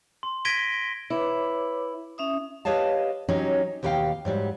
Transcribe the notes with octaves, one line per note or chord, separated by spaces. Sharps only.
C6
G#6 A#6 B6 D7 D#7 G7
E4 B4 C#5 D6
C#4 E5 D#6
G4 B4 C#5 D#5 F5 A5
F#3 C#4 D#4 G4
D#2 B2 G4 A#4 F5 G5
G#2 F#3 G3